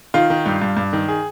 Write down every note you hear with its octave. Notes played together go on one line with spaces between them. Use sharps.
D#3 F4
D#3
G2
G2
G2
D#3
G#4